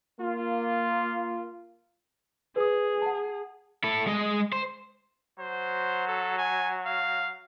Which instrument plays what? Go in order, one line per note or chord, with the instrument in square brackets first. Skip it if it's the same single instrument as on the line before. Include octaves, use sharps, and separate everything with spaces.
[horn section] A#3 F4
[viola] G#4 [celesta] B4 D#6
[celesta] F#5 A5
[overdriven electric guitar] E4 A4
G#3 D#5
C5
[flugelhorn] F#3 [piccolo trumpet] C5
[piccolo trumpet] A4
G#5
F5